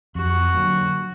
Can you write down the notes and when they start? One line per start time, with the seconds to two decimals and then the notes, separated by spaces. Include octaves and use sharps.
0.15 F2 F#4
0.54 D3 F#3 A#3